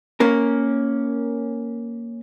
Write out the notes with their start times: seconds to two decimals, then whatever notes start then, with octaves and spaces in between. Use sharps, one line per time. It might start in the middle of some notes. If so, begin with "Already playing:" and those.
0.20 A#3 C#4 A#4